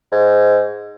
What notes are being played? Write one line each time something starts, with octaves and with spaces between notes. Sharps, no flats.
G#2